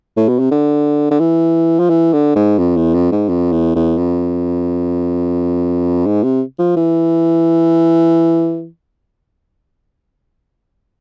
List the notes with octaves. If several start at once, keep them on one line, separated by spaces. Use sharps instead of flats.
A2
B2
C3
D3
D3
E3
F3
E3
D3
G#2
F2
E2
F2
G#2
F2
E2
E2
F2
G#2
C3
F3
E3